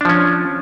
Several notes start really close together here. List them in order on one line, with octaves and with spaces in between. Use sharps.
D4 F3 C#4